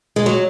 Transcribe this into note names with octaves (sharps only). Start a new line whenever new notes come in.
G#3
F#3